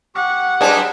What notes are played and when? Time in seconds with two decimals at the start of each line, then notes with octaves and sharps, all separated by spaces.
0.15 G4 F#5 C#6
0.61 F#2 F#3 G3 C4 D4 G#4 B4 D#5